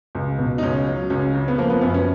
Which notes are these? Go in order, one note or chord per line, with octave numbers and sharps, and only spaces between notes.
C#2
B2
D#4
C#2 C#4
F#3
C#2 C#4
C#3
B3
F3 A#3
B3
F#2 B3
C#4